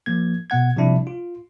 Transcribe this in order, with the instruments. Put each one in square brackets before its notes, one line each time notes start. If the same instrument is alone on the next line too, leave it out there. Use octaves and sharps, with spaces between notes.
[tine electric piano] F3 A#3 G#6
B2 B3 F#5 G#6
C3 F3 G3 D4 E4
F4